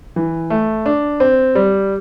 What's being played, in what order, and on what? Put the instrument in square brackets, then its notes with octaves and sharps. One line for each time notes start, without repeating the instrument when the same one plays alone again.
[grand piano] E3
A3
D4
C4
G3